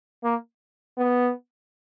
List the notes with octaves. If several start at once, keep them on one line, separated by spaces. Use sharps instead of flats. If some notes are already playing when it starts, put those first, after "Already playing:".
A#3
B3